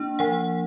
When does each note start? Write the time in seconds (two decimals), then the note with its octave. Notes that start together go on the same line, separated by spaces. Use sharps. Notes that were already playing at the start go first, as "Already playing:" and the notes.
Already playing: A#3 D4
0.19 F3 F#5